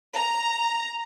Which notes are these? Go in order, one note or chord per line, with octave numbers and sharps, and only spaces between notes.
A#5